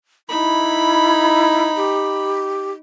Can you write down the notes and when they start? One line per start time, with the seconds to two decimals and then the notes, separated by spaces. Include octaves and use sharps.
0.29 D#4 E4 B5
1.76 G4